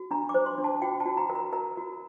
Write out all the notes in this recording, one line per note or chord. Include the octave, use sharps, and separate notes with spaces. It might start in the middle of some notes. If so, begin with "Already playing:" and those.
Already playing: F#4
D4 A#5
D6
C5
C6
D4
A5
F#4 G5
A5
F#4
A#5
A#4
A#5
A#4 A#5
F#4